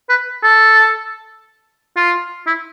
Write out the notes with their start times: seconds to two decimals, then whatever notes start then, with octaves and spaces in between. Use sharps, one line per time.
0.09 B4
0.44 A4
1.96 F4
2.47 E4